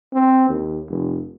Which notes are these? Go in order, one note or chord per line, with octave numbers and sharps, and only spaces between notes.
C4
D#2
F1